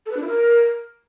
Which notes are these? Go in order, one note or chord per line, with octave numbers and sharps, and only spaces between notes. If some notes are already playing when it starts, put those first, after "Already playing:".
A4
B4
D4
E4
A#4